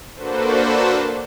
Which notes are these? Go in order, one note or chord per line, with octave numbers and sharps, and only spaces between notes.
A#3 D4 F#4 A4 B4 C5